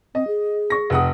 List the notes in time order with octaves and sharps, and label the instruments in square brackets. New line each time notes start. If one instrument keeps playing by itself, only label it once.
[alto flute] C4 [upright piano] D#5
[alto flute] G#4
[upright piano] C#6 A#6
F1 F#5 D#6